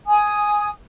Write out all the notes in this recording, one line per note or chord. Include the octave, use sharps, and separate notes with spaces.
G#5 D#6